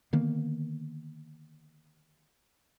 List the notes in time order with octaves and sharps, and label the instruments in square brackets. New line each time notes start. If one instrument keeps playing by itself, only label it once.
[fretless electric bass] D3 D#3 A#3 B3